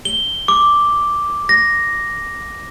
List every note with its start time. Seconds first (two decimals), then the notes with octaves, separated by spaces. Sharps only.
0.05 G7
0.48 D6
1.49 A#6